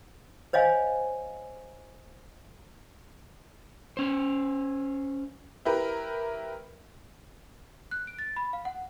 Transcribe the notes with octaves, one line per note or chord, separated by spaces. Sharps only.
C5 C#5 D#5 F5 G#5
C#4 C5
E4 G4 A#4 B4
F#6
D7
A6
B5
F5
F#5